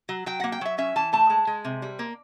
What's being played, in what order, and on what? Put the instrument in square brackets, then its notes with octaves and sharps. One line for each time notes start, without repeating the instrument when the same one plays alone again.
[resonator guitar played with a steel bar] F#3
F#3 G5
A#3 F#5
G5
F#3 E5
C#4 E5
E3 A5
A3 A5
G#3
G#3
C3
G3
A#3